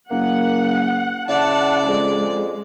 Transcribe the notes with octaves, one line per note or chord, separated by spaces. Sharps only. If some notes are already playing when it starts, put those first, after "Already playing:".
F#1 A#3 F#5
C#3 E4 D5 F#5 A5
F2 G#3